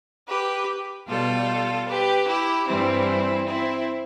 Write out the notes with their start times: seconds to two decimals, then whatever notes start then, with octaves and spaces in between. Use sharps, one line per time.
0.28 G4 B4
1.08 B2 G3 F4 A4
1.88 G4 B4
2.28 E4 G4
2.67 G2 E3 G3 C4 E4
3.47 C4 E4